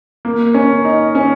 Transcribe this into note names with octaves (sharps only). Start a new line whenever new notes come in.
A#3
C#4
D#4
C#4